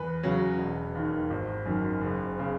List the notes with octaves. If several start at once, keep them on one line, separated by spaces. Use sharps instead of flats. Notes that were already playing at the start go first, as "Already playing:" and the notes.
Already playing: E2 B4
C#3 F#3
E1
D#2 D#3
G#1
F#2 D#3
F#1
C#3